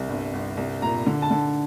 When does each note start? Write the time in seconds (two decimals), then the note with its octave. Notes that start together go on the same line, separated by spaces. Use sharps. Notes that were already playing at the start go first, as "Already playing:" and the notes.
Already playing: C2
0.08 G1
0.33 G1
0.57 C2
0.82 A#2 A#5
1.06 D3
1.22 A5
1.31 D3